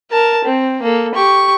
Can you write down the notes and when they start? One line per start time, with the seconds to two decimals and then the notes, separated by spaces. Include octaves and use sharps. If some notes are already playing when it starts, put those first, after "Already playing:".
0.11 A#4 A5
0.45 C4
0.82 A#3 A4
1.15 G4 C#6